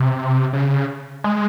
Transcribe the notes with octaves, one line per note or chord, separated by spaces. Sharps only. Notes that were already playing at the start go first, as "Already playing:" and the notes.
Already playing: C3
C#3
G#3